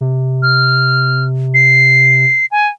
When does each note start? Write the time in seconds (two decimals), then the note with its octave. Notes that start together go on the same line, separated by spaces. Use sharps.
0.01 C3
0.42 F6
1.54 C7
2.51 G#5